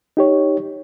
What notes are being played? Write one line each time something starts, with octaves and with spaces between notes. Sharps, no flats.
D#4 G4 C#5